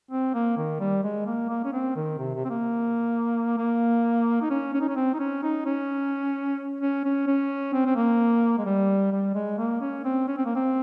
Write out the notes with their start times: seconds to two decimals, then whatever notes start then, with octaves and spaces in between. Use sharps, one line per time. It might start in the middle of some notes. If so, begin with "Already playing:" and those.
0.11 C4
0.34 A#3
0.57 D#3
0.80 G3
1.04 G#3
1.27 A#3
1.49 A#3
1.65 C#4
1.73 C4
1.96 D#3
2.19 C3
2.35 C3
2.45 C4
2.50 A#3
3.57 A#3
4.42 D#4
4.50 C#4
4.73 C#4
4.81 D#4
4.89 C#4
4.96 C4
5.14 D#4
5.19 C#4
5.43 D#4
5.65 C#4
6.81 C#4
7.04 C#4
7.27 C#4
7.73 C4
7.86 C4
7.96 A#3
8.58 G#3
8.66 G3
9.12 G3
9.35 G#3
9.58 A#3
9.81 C#4
10.05 C4
10.28 C#4
10.37 C4
10.46 A#3
10.55 C4